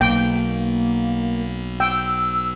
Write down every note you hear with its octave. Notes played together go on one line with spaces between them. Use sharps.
B1 A#3 G5
G5 E6